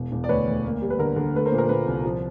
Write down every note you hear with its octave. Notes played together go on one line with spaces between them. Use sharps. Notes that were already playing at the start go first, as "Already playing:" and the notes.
Already playing: E1
E1
D5
D2 B4 C#5
D2
A#3
G3
B4
D3 A#4
D3
A3 B4
A#4 C5
A#2
A#4
A#2 B4
C2
F3